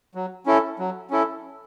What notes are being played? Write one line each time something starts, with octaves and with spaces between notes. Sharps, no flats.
F#3
C#4 E4 A4
F#3
C#4 E4 A4